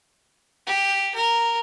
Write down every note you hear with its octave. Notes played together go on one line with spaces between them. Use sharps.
G4
A#4